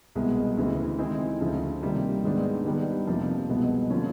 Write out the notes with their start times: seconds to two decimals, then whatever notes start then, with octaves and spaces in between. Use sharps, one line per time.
0.15 C2 B2 G#3 B3
0.57 D2 C#3 E3
0.98 D#3 G#3 C4 E4 G#4
1.41 D2 C#3 F3
1.82 C3 D#3 G3 A#3
2.23 G#2 D#3 G#3 B3 D4
2.65 D#3 G3 B3 D4
3.07 F2 C3 F3 A#3
3.49 C2 B2 G#3 B3
3.90 D3 F3 A#3 C#4